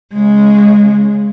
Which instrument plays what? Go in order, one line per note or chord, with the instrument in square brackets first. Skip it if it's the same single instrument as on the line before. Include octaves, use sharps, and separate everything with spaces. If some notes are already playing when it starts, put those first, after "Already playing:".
[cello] C#3 G#3